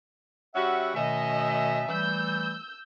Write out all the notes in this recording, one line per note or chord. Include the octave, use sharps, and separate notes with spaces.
G3 C#4 F#4 E5 F#5
B2 D#3 A3 C#4 D#5 E5
E3 G3 A3 E6 G6